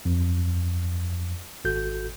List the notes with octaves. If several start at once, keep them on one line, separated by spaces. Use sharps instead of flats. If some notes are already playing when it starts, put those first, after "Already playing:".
F2
G#1 F#4 A4 G6